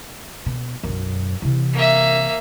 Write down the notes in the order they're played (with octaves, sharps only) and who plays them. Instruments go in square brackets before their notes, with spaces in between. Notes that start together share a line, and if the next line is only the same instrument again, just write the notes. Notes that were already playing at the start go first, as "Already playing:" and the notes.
[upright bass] B2
B1 F#2
C3 E3
[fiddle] A#3 E5